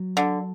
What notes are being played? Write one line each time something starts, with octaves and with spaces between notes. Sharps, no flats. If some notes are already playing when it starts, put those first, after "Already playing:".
Already playing: F#3
D3